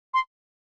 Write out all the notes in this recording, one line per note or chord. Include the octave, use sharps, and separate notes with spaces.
C6